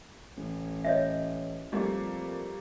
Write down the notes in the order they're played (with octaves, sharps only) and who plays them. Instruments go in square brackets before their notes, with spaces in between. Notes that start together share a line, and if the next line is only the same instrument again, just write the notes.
[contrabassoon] A1
[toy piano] C#5 D#5 E5
[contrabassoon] F2 [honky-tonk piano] G3 A3 A#3